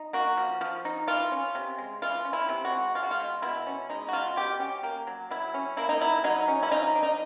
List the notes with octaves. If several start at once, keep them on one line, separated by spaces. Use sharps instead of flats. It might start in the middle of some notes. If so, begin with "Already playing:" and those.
Already playing: D#4
A#3 F#4
F3
F3
D#4
E3 F4
C#4
C3
G#3
E3 F4
C#4
E4
C3
F#4
G#3
G#3 F4
F#4
F4
B2
B2 E4
C#4
G#3 D#4
F#4
B2 F4
B2 G4
C#4 G4
A#3
F#3
F#3 E4
C#4
A#3 E4
D#4
F#3 E4
F#3 D#4
C#4
E4
F3 D#4
D4
D#4